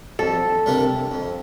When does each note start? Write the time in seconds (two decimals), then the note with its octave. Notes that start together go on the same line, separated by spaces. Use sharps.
0.19 F2 A4
0.66 C3 G3 A#3 D4
1.11 F2